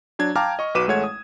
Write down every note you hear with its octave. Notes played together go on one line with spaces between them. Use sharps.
F#3 D4 G#6
F5 G5 A5 A#5 D6 F6
D#5 C#6
B1 F#4 B4 D6 D#7 E7
A1 G#3 A3 C#5 F#5 G#6
D#6